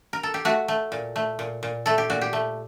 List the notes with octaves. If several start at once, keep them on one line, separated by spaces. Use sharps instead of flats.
A#4
A4
G4
A3 F#4
A3
A#2
A3
A#2
A#2
A3 A4
G4
A#2 F#4
G4
A3